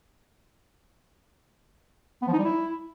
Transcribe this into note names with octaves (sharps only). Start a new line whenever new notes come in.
B3
F3
D#4
G3
E4